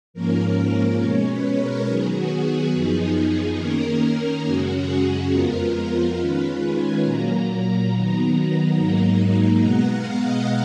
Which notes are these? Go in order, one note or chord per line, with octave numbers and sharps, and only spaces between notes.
G#2 F3 A#3 C#4 A#4
B2 G#3 C#4 C#5
B4
A#4
D#3 F#3 B3 G#4
F#4
G#4
F#2 F3 B3 D#4 G#4
D#3 A#3 C#4 A#4
F#2 C#3 G#3 C#4 F#4
G#4
G#4
F2 F3 G#3 B3 F4 A#4
D#3 G#3 C#4 F4 B4
G#5
A#2 F#3 A#3 A#5
D#3 F#3 B3
G#2 F#3 A#3 D#4
B2 G#3 B3 F#5
F5
D#5